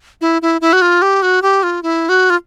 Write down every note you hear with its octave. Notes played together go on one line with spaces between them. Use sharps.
E4
E4
E4
F#4
F4
G4
F#4
G4
F4
E4
F#4
F4